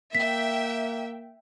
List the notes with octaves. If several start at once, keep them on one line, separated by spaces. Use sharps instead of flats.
A#3 E5 G5 B6